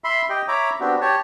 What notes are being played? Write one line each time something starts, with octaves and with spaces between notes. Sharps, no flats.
E5 B5 C6
G4 D#5 G5
C#5 E5 A#5 B5 D6
B3 C4 D4 F#4 G4
G4 C#5 A5